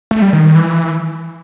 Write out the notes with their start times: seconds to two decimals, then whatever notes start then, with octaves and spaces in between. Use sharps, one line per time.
0.11 A3
0.22 G3
0.33 D#3
0.44 D#3
0.55 E3